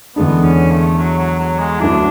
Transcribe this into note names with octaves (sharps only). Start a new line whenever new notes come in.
E2 D3 G#3 B3 D4
C#4
A3
F#3
F#3
F#3
G#3
D2 D3 F#3 A3 D4 E4